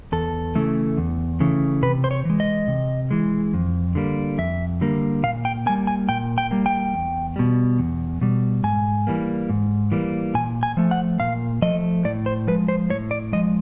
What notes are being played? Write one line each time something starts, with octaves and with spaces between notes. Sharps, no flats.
E2 A4
C#3 E3 A3
E2
C#3 E3 A3
C3 B4
C5
C#5
E3 G#3
D#5
C3
E3 G#3
F2
D3 G3 A#3
F2 E5
D3 G3 A#3
A#2 F5
G5
G3 A#3 G#5
G#5
A#2 G5
G5
G3 A#3
G5
E2
B2 G3
E2
B2 G3
G#2 G#5
E3 G3 A#3
G#2
E3 G3 A#3
A#2 G#5
G#5
F3 A3
F#5
A#2 F5
F3 A3 D#5
A2 D5
C5
F3 G#3 B4
C5
A2 C#5
D5
F3 G#3 D#5